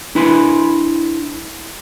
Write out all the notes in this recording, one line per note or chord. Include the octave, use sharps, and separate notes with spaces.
D4 E4 B4 G#5 B5 C6